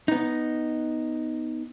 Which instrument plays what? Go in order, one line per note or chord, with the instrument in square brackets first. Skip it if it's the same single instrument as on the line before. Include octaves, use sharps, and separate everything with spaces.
[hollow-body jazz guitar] B3 D#4